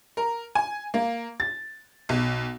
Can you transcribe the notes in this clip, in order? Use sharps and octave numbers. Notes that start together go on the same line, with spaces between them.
A#4
G#5
A#3
A6
B1